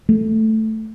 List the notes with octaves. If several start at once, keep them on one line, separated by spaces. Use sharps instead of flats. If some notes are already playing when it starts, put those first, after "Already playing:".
A3